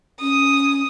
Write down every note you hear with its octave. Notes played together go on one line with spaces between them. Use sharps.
C#4 D#6